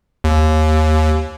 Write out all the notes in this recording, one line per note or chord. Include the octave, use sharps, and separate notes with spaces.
D#2